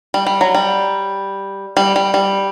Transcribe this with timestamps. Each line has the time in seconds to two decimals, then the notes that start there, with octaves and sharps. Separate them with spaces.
0.14 G3
0.26 G3
0.41 F#3
0.55 G3
1.77 G3
1.96 G3
2.14 G3